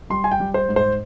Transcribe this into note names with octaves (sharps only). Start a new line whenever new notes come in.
G3 C6
G#5
G5
G3
C5
G#2
C5